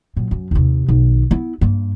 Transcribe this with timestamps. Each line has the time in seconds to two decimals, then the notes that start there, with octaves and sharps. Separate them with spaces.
0.17 A#2 F#3
0.31 F#2
0.51 D#2 C3
0.89 B1 D#3
1.31 B3 E4
1.61 G2 A#3